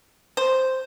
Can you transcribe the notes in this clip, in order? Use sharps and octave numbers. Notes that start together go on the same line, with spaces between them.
C5